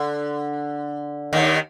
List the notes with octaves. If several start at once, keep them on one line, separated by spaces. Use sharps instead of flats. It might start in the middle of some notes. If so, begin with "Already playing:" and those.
Already playing: D3
D#2 D#3